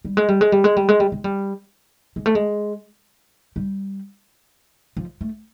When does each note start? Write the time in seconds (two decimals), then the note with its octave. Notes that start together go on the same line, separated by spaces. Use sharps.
0.05 G3
0.17 G#3
0.28 G3
0.41 G#3
0.52 G3
0.64 G#3
0.77 G3
0.89 G#3
1.00 G3
1.12 G#3
1.24 G3
2.16 G#3
2.26 A3
2.35 G#3
3.56 G3
4.97 F3
5.21 A3